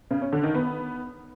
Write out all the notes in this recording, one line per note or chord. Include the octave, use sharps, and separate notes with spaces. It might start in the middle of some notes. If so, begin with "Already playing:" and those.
C#3
C#4
D3
D#3
B3